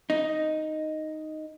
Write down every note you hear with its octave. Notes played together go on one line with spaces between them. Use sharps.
D#4